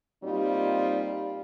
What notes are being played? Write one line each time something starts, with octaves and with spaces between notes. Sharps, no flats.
A#2 G3 C4 D#4 F4